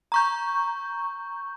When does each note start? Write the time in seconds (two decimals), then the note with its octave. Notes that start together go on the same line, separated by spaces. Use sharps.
0.12 A#5 C#6 G6